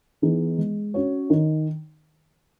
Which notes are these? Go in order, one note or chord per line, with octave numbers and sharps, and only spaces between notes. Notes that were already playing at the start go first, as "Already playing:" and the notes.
E3 B3 D#4 G#4
G#3
C#4 F#4 C#5
D#3